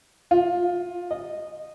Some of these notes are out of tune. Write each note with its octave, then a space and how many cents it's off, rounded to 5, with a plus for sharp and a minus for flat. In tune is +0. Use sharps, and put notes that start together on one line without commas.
F4 +20
D#5 -10